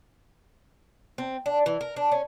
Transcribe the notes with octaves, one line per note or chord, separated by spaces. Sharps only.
C4
D4
E3
A#4
D4
C#4